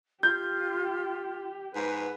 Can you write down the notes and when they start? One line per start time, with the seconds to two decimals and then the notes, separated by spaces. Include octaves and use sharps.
0.23 F4 G4 G6
1.75 G#2 B4